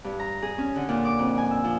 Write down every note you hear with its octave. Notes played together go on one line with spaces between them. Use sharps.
G2
A#5
G#4
C#4
D3
A#2
D6
F2
G#5
E6
F3